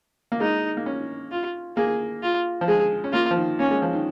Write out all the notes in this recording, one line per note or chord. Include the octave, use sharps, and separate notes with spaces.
A#3
G#3 D#4
A#3
C#4
F4
A#3 G#4
F4
F3
G#3 G#4
C#4
A#3 F4
F3
D#3
A#3 C#4
G#3
F3
D#3